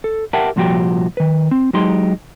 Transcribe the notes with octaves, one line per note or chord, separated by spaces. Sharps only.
A4
G4 A#4 E5 F#5 G5 A5
C2 A#2 F3 F#4 G4 G5
D#3 B4
C4
F#3 G#3 D#4 G4 C6